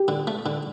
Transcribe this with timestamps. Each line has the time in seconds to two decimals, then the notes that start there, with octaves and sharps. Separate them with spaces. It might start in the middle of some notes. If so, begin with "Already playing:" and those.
Already playing: G4
0.08 D3
0.27 A3
0.46 D3